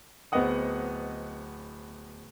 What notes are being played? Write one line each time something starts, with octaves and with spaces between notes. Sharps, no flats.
D1 B3 C4 D#5 F#5 D#6